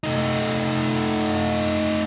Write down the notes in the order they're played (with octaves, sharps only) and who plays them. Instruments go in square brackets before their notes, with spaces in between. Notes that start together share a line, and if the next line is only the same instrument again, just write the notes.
[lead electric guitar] A3 D#4